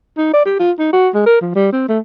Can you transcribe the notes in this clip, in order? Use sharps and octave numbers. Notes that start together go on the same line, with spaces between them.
D#4
D5
G4
F4
D#4
F#4
G#3
A#4
F3
G3
C4
A3